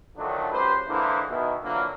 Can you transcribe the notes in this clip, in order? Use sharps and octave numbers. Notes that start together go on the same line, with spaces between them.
D3 D#3 F3 F#3 A3 D4
C#2 F#2 G4 B4 C5
D3 E3 G#3 A#3 E4 C5
B2 D#3 E4
F2 D3 E3 F#3 A#3